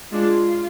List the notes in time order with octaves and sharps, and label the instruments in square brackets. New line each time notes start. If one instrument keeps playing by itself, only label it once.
[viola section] G#3 D4 F4